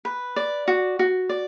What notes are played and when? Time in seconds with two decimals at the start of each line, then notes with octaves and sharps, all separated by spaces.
0.05 B4
0.36 D5
0.68 F#4
0.99 F#4
1.29 D5